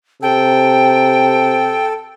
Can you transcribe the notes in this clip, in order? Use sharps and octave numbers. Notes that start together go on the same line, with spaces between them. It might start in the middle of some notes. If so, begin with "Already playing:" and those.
C3 A4 G5